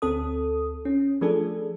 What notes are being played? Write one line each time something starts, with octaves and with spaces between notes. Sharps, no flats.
D2 C4 A4 D#6
C#4
F3 A3 D4 G#4 A4